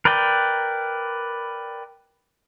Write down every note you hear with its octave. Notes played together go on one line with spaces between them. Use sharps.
A#4 B4 D5 G5